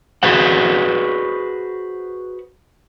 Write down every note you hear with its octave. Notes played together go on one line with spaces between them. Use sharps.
F#4 G#4 B4 C5 F#5